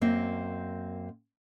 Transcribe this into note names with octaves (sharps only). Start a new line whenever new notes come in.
F#2 A#3 C4 D#5